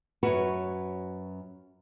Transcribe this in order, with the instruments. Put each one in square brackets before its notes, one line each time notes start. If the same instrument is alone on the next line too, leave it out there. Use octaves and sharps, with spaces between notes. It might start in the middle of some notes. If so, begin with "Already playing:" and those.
[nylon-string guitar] F#2 F#4 B4 C#5